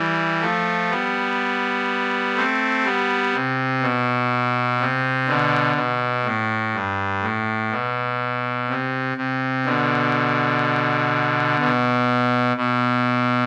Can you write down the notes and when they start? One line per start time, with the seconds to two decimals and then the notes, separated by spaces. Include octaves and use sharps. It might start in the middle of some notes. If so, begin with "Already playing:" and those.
Already playing: E3 G3
0.41 F3 A3
0.90 G3 B3
2.36 A3 C4
2.85 G3 B3
3.34 C3
3.82 B2
4.80 C3
5.28 B2 D3
5.76 B2
6.25 A2
6.74 G2
7.23 A2
7.72 B2
8.69 C3
9.17 C3
9.65 B2 D3
11.60 B2
12.57 B2